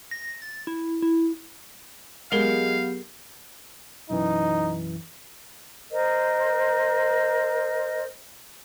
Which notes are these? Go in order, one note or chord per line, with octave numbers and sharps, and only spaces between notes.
A#6
A6
E4
E4
F#3 G#3 B3 G4 G#4 A#4 F5
B1 F#2 E3 D#4
A#4 C5 D#5